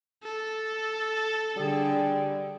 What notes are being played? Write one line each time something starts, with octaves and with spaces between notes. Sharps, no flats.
A4
D3 G3 G#4